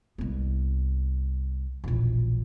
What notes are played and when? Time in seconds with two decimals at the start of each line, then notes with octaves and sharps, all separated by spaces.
0.18 C2 B3
1.84 E1 A#1